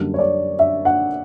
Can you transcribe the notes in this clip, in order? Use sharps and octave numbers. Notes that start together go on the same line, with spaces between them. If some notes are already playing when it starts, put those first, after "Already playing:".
Already playing: F#2 D3 G3 A#3
C#5
D5
E5
F#5